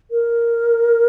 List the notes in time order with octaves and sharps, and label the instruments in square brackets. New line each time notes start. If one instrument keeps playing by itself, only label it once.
[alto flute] A#4